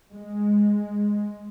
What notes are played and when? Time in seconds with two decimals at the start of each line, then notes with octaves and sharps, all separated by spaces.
0.12 G#3